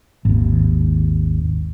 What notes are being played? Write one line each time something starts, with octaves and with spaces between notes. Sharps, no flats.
G#1 D#2